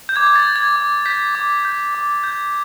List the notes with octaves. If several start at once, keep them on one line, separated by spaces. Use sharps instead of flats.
G6
D6 G#6
G#6
A6
G6
G#6
D6
G6 B6
D6
G6
D6
G6